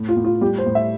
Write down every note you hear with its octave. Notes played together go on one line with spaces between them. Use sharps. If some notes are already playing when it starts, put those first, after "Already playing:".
Already playing: A2
F4
A2
F4
G3 G4
C5
A2
E5